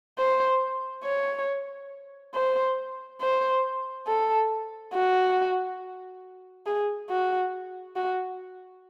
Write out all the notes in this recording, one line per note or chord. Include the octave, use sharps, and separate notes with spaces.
C5
C#5
C5
C5
A4
F#4
G#4
F#4
F#4